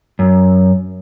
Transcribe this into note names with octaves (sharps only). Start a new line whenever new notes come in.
F#2